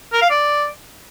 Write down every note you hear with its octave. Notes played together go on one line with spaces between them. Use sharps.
A#4
F5
D5